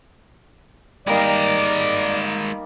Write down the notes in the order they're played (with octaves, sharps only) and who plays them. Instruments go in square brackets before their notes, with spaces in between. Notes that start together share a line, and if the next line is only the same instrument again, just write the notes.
[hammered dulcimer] G3 A#3 D#4 [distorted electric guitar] G#3 A#4 [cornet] D5